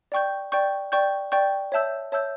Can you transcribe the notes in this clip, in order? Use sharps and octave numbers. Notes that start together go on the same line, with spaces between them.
D5 G5 C#6 G6
D5 G5 C#6 G6
D5 G5 C#6 G6
D5 G5 C#6 G6
C#5 E5 A5 E6 G6
C#5 E5 A5 E6 G6